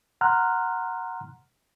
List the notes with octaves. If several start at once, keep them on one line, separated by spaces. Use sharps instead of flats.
F#5 A#5 C6 F6 F#6